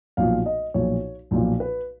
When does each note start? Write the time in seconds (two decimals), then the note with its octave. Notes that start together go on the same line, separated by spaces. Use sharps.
0.17 B1 A#2 F3 F5
0.46 D#5
0.74 B1 A#2 F3 C#5
1.31 B1 A#2 F3
1.60 B4